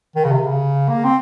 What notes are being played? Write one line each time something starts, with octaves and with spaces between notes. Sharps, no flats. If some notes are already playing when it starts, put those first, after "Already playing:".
D#3
C#3
C3
C#3
A#3
C4